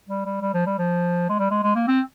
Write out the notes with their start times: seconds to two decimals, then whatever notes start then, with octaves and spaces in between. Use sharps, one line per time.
0.09 G3
0.26 G3
0.42 G3
0.54 F3
0.67 G3
0.79 F3
1.29 G#3
1.39 G3
1.51 G#3
1.63 G#3
1.75 A#3
1.88 C4